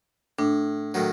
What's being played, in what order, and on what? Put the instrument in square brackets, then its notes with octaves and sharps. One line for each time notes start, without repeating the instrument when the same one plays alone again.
[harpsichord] A2 [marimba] D4
[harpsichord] A2 D#3 F#3